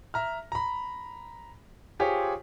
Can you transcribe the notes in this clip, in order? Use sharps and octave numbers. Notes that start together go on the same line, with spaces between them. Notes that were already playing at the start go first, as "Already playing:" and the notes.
E5 A#5 F6
A#5 B5
F4 G4 G#4 C5 C#5